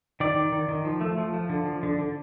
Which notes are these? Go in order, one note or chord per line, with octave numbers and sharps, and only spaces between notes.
D#3 D5
D#3
D#3
D#3
F3
A3
F3
F3
D3
F3
D3
D3